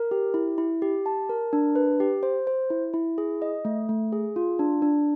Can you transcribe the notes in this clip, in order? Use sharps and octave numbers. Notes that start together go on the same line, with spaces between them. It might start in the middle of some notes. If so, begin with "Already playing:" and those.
Already playing: A#4
G4
E4
E4
G4
A5
A#4
D4
B4
G4
C5
C5
E4
E4
G#4
D#5
A3
A3
G#4
F4
D4
D4